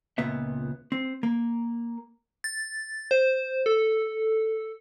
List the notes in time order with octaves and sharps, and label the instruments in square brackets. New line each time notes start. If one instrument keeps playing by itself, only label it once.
[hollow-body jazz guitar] C#2 A#2 B3 E5
C4
A#3
[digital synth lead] A6
C5
A4